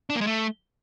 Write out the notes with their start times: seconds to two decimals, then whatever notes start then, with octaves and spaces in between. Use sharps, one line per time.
0.10 D4
0.15 A#3
0.21 G#3
0.27 A3